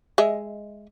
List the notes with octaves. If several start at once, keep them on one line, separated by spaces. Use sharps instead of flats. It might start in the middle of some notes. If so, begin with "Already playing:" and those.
G#3 D#5 E5